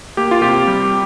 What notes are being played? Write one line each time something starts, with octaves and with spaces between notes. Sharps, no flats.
A#3 G4
F4
C3 G4
G3